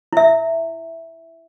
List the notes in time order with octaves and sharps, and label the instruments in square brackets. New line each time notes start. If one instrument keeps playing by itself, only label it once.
[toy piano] E4 E5